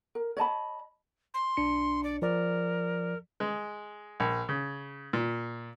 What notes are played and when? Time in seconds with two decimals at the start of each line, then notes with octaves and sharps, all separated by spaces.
0.15 A#4
0.37 C#5 D#5 A5 B5
1.34 C6
1.57 B1 D4 C#7
2.04 D5
2.22 F3 A#4 D5
3.40 G#3
4.20 A#1
4.49 C#3
5.13 A#2